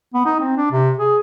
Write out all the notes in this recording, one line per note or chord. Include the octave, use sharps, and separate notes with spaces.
B3
D#4
C4
D4
C3
G#4